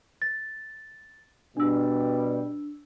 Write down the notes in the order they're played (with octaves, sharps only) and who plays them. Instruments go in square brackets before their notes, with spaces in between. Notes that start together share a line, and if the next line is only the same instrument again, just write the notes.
[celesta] A6
[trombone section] B2 G3 [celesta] D4 E6